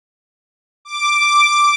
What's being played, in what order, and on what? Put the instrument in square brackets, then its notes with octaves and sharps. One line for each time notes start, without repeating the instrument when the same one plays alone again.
[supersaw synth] D6